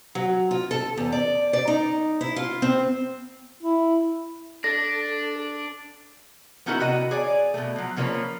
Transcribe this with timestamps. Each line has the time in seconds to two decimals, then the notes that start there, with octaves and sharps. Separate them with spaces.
0.15 F#3
0.51 F4
0.71 A4
0.97 E2
1.12 D5
1.53 D5
1.68 D#4
2.21 E4
2.36 F4
2.62 C4
3.63 E4
4.64 D4 A4 A#6
6.66 B3 C#4 D#4 E4 F#4 A#4
6.80 C3 B3 F#4 D#5
7.11 G#4 C#5 D5 G#5
7.54 B2 A3
7.76 F3 F#3
7.96 C#3 F3 A#3 E4 B4 C#5